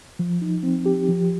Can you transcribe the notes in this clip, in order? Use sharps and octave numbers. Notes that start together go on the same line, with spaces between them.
F3
D#4
C4
G4
F3